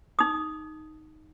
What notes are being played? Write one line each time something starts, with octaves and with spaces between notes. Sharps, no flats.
D#4 D#6